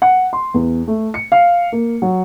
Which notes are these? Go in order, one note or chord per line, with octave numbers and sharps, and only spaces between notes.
F#5
C6
E2
A3
C#7
F5
A#3
F#3